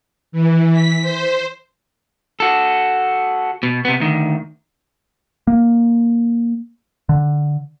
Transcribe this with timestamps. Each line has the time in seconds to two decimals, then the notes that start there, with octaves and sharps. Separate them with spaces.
0.32 E3
0.73 B6
1.02 C5
2.40 F#4 A4
3.63 B2
3.85 C3 B3
4.00 D2 D#3
5.47 A#3
7.09 D3